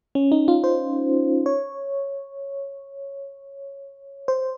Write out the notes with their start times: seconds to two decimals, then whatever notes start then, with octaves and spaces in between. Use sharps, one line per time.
0.15 C#4
0.32 D#4
0.48 F4
0.64 C5
1.46 C#5
4.28 C5